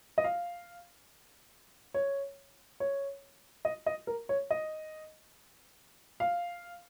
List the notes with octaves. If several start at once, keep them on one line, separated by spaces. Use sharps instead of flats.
D#5
F5
C#5
C#5
D#5
D#5
A#4
C#5
D#5
F5